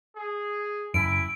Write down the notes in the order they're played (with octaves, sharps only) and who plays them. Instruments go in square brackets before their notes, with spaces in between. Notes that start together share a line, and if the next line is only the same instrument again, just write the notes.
[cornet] G#4
[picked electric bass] F#1 F#2 [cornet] E4 [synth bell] D7